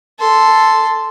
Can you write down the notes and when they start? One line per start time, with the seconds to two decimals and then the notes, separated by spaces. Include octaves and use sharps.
0.19 A4 C6